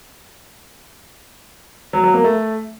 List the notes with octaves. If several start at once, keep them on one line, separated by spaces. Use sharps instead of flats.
F#3
F#3
A#3
A3